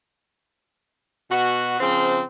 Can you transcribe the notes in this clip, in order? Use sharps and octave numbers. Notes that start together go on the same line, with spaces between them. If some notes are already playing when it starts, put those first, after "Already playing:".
B2 F#4
C#3 F3 C4